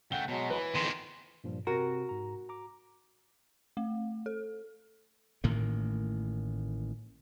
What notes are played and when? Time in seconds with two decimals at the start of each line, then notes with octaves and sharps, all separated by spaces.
0.12 C#3 A3 F#5 G5 G7
0.28 B2 F#3 G#3
0.50 E3 B4
0.75 F2 D#3 E3 B3 G#4 C6
1.44 G2 A#2 F3
1.67 C3 C4 F#4 A#4
2.09 G#2 A#5
2.49 A#5 D6
3.77 A3
4.26 A4
5.44 A1 A2 D#3 A#3